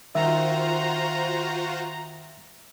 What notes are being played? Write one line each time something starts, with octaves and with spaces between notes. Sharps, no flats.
D#3 F4 F#4 C5 E5 A#5